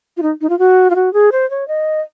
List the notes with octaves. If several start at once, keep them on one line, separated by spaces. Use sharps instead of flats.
F4
D#4
D#4
F4
F#4
F4
F#4
G#4
C5
C#5
D#5